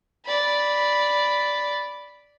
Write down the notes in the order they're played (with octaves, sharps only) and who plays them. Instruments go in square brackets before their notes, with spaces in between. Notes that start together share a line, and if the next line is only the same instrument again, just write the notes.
[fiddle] D5 B5